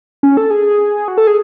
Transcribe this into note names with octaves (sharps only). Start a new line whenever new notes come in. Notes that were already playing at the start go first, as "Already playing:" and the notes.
C#4
A4
G#4
F#4
A4
G#4